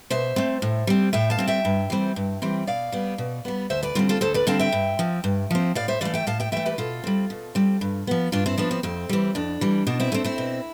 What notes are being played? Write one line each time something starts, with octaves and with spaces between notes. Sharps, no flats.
B2 C5 E5
A3 C4
A2
G3 C4
A2 E5 G5
F5 A5
G3 C4
E5 G5
G2
E3 G3 C4
G2
E3 G3 C4
B2 D5 F5
G3 B3
B2
G3 B3
D2 C5 E5
B4 D5
D3 G3 C4 D4 F4
F4 A4
D2 A4 C5
B4 D5
D3 G3 C4 F5 A5
E5 G5
G2
F3 C4
G2
F3 C4
A2 D5 F5
C5 E5
E3 A3 D5 F5
E5 G5
A2 F5 A5
E5 G5
E3 A3 E5 G5
G4 B4
B2 F4 A4
G3 C4
B2
G3 C4
G2
F3 B3
G2 D4 F4
C4 E4
F3 B3 D4
C4
F2 C4
E3 G3
F2 D4
E3 G3
B2 D4
C4 E4
A3 C4 D4
C4 E4
B2